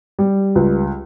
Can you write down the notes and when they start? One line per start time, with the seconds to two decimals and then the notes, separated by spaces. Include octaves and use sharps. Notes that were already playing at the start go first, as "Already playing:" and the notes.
0.19 G3
0.55 C#2